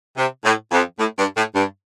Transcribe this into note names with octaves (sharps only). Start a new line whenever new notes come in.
C3
A2
F2
A2
G2
A2
G2